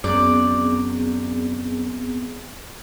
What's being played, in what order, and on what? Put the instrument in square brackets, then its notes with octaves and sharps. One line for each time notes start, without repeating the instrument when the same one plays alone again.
[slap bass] F#2 [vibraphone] B3 C4 G#4 [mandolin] D5